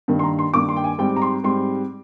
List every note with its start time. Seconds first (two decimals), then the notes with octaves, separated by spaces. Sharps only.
0.08 G2 D#3 A#3
0.19 C6
0.24 A#5
0.39 C6
0.54 G2 D#3 A#3 D6
0.69 C6
0.76 G5
0.84 G#5
0.99 G#2 G3 C4 G5
1.16 A#5
1.22 C6
1.44 G#2 G3 C4 C6